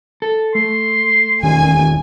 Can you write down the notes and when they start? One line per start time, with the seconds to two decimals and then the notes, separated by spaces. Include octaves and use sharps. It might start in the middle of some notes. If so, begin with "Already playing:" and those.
0.22 A4
0.55 A3 C6
1.42 E1 D#3 C#4 G#5